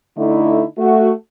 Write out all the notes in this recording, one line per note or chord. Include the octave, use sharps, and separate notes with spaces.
D3 A3 D#4 E4
A3 F#4